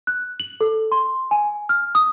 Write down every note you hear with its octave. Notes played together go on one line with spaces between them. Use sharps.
F#6
F#7
A4
C6
G#5
F6
D#6